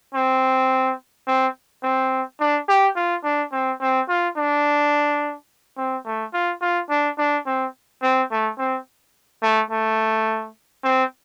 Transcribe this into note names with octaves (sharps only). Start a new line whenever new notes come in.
C4
C4
C4
D4
G4
F4
D4
C4
C4
F4
D4
C4
A3
F4
F4
D4
D4
C4
C4
A3
C4
A3
A3
C4